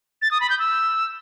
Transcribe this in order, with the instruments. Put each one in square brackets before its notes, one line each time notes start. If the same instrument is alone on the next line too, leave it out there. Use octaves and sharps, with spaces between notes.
[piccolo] A6
D#6
B5
G6
E6